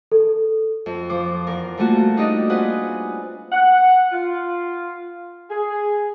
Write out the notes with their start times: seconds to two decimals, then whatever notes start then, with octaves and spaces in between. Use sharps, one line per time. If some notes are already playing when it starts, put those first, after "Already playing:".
0.12 A4
0.86 F2
1.09 F3 C5 D6
1.47 E2 A#4
1.78 G3 A3 A#3 F4 F#4
2.17 D4 D#4 G4 D5 D#5
2.49 C4 F4 G#4 B4 F#5
3.52 F#5
4.12 F4
5.50 G#4